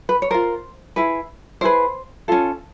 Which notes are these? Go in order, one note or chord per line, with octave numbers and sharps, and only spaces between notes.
B4
C#5
F4 A#4 C5
E4 G#4 B4
E4 G#4 B4 C5
C#4 F4 A4